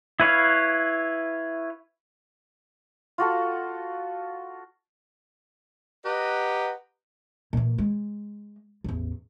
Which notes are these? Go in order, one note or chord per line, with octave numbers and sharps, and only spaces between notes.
E4 B4 C#5 F5
F4 F#4 A4
G4 B4 D#5 F#5 A#5
A#2 E3
G#3
A1 E2